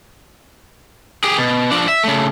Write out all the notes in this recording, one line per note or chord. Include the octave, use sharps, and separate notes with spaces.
G4 G#4
B2
F3 D4
E5
C#3 A3